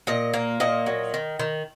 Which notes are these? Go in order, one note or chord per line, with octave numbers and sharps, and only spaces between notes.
A#2 D#5
A#3
A#2 D#5
F#3
D#3
D#3